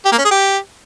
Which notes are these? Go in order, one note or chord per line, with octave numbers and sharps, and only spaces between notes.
G4
A#3
C#4
G#4
G4